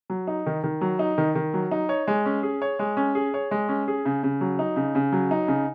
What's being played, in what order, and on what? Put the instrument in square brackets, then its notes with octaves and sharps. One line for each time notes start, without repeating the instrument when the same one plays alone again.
[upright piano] F#3
D#4
D#3
D#3
F#3
D#4
D#3
D#3
F#3
D#4
C#5
G#3
C#4
G#4
C#5
G#3
C#4
G#4
C#5
G#3
C#4
G#4
C#3
C#3
F#3
D#4
C#3
C#3
F#3
D#4
C#3